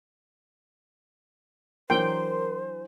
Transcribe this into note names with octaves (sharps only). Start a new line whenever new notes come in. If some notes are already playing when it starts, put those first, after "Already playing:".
E3 F#3 D4 A#4 C5 G5 C6